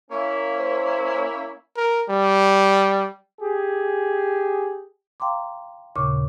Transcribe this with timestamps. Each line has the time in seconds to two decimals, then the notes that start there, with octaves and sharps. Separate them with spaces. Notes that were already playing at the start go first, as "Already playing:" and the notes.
0.11 A#3 C#4 E4
0.56 C5
1.76 A#4
2.10 G3
3.41 G4 G#4
5.20 F5 G5 A#5 C6 D6
5.96 D#2 A#2 C#3 C#6 D6